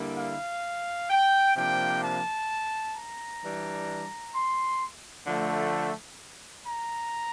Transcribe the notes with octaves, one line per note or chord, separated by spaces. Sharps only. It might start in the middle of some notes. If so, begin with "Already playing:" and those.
Already playing: D3 G3 A#3 E4
F5
G5
C3 F3 A#3 D4 G5
A5
A#5
E3 G3 D4
C6
D3 F3 A3
A#5